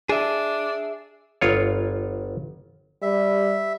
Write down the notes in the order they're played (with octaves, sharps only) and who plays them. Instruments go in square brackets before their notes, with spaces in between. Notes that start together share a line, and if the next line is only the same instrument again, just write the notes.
[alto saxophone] D4 [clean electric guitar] G#4 E5
[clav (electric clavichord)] G1 F4 C#5
[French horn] G3 [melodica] E5